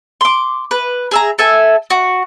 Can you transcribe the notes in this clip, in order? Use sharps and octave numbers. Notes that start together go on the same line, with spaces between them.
C6 D6
B4
G#4 E5 A#5
A4 E5 G#5
F#4